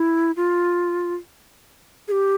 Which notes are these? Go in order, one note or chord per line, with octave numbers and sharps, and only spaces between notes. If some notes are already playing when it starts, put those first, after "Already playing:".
Already playing: E4
F4
G#4
G4